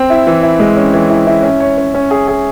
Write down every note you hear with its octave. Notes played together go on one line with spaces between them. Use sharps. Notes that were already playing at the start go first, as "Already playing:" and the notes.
Already playing: C4
E4
E3
E4
G#3
C#4
E3
E4
E4
C#4
C#5
C#4
C#4
G#4
G#4